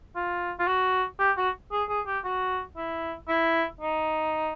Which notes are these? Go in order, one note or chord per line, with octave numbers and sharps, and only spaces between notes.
F4
F4
F#4
G4
F#4
G#4
G#4
G4
F#4
E4
E4
D#4